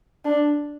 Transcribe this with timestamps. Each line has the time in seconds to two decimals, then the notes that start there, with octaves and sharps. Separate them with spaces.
0.25 D4